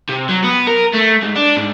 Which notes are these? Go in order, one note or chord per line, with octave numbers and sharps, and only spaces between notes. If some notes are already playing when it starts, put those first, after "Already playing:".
C3
F#3
B3
A#4
A3
G#2
D4
G#2